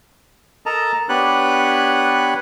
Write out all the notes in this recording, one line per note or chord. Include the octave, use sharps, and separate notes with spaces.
A4 A#4 D#5 A5 A#5
B3 D4 G4 B4 C#5 F#6